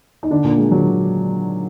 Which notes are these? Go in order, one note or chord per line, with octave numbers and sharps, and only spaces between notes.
D#4
D3 D4
A#2 A#3
G#3
F#3